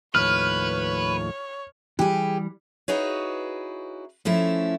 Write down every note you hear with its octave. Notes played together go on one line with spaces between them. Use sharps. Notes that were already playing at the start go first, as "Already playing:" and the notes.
D#2 A2 F3 B4 C#5 F6
E3 G3 G4 G#4
D#4 E4 F#4 G#4 B4 C#5
F3 A3 C#4 E4